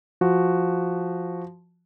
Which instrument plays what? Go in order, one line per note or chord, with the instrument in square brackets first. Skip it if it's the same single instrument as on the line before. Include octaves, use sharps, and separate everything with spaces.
[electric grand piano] F3 F#4